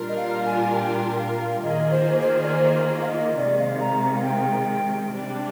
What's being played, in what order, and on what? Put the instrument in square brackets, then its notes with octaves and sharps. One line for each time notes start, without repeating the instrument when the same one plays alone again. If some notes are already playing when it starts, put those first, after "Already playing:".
Already playing: [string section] A#2 G3 D4 F4 A#4
[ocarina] D#5
F5
G#5
G5
F5
[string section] D#3 A#3 F4 G#4 [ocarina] D#5
[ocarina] C5
C5
D5
C5
F5
D#5
[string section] C3 D#3 G#3 [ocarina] D5
[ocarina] F5
A#5
A#5
F5
G5
[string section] C3 G3 D4